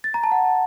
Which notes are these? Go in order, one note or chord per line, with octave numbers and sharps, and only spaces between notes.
A6
A#5
A5
F#5